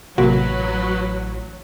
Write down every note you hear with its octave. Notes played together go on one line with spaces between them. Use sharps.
A1 C3 F#3 A#3 F#4 B4